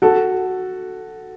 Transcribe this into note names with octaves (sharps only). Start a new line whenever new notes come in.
F#4 A4